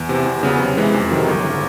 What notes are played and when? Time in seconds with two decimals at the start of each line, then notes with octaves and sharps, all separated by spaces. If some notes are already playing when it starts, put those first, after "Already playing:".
Already playing: E2
0.09 C3 E3
0.26 E2
0.43 C#3 F#3 B3
0.59 C3
0.77 E3 G#3
0.94 F2
1.11 C3 D#3 F#3
1.28 G1
1.46 C#3